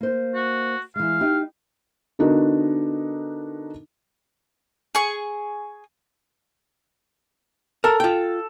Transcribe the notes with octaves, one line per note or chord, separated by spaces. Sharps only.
A#3 C5
F#4
E3 G#3 F5
D#4 G4
D3 B3 D4 D#4 F#4 A#4
G#4 C#6
A4 A#4
F4 G5